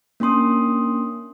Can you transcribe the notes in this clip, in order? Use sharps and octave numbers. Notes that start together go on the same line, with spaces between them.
A#3 C#4 D4 C6 D#6